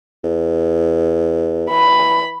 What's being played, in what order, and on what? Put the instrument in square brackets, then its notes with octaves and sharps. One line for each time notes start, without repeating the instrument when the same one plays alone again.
[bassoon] E2
[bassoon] E3 [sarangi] B5